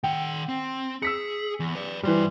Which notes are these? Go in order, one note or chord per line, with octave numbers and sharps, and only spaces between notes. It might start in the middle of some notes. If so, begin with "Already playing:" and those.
D#3 F#5 G5
C4
G#4 E6 B6 C#7
E2
B4 D5
G2 E3 G3 C5